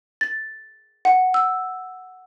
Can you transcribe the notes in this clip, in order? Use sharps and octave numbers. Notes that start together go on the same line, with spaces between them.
A6
F#5
E6